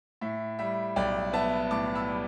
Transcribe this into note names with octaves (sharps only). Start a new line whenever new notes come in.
A2 E5
G3 E5
B1 D5 G5
B3 E5 A5
A2 A5 D6
B5 E6
G3